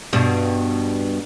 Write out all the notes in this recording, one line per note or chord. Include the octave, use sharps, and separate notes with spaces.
G2 B2